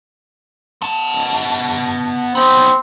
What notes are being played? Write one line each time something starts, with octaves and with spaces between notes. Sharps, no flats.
B3 A5
B3 C4 D#4